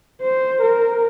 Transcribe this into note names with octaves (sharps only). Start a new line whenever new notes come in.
C5
A#4